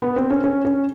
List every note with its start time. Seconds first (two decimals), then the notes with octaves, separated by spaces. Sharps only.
0.02 B3
0.16 C4
0.30 C#4
0.44 C#4
0.65 C#4